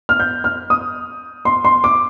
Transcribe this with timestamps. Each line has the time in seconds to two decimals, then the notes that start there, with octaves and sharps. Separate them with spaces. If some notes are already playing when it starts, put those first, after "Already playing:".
0.09 F6
0.20 G6
0.44 F6
0.70 D#6
1.45 C6
1.65 C6
1.84 D6